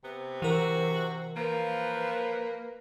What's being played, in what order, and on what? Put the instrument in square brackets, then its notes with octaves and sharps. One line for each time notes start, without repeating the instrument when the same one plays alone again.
[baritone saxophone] C3 [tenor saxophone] B3
[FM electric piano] E3 A#4 [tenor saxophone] F#4
[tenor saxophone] F3 [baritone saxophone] A#3 [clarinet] B4